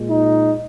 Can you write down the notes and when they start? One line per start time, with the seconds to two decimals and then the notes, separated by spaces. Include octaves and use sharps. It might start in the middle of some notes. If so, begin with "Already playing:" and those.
Already playing: A#2 G#3
0.09 D#4